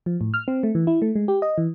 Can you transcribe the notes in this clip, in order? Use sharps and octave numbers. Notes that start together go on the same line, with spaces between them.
F3
A2
F6
C4
A3
E3
E4
A3
G#3
G4
D#5
E3